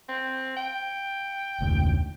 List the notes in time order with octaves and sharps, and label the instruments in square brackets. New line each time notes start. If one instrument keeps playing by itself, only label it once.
[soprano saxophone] C4
G5
[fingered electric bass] F1 D2